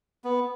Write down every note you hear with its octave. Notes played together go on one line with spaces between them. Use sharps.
B3